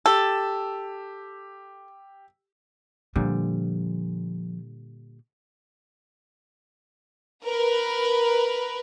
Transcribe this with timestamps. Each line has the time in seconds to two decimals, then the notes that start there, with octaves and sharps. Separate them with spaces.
0.06 G4 A4 E6
3.16 A#2 D3 F3 G3
7.45 A#4 B4